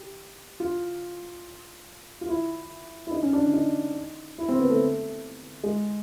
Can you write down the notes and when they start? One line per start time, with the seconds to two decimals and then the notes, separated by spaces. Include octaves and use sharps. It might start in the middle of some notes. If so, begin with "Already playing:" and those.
Already playing: G4
0.60 F4
2.21 F4
2.29 E4
3.07 E4
3.11 D#4
3.23 C#4
3.33 D4
3.53 D#4
4.38 E4
4.49 C4
4.60 B3
4.70 A3
5.63 G#3